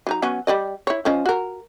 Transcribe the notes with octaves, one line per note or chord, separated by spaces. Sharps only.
F#3 D#4 A#5
F#3 B3 C#4
G3 D5 D#5
E4 C#5
F3 C#4 D#5
F#4 A#4